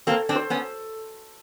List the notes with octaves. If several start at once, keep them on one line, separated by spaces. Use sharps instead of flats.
A#3 C4 A4
C4 D4
C5
B3 C#4